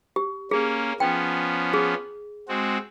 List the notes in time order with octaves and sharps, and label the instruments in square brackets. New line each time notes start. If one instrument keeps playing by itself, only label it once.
[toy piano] G4
[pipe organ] A#3 C#4 [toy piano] G#4
[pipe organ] F3 B3 C#4 [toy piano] G5
[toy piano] G#4
[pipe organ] G#3 C4 F#4